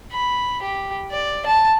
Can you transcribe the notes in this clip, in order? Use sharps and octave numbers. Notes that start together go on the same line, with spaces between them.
B5
G4
D5
A5